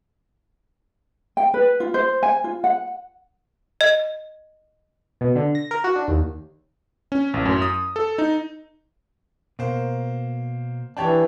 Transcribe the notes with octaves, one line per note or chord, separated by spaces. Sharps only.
G5
B4
F4
C5
G#5
F4
F#5
D#5
B2
D3
A#6
A#4
F#4
D4
D#2
C#4
A1
F#2
D#6
A4
D#4
B2 A#3 C5
E3 D4 G4 C#5 A5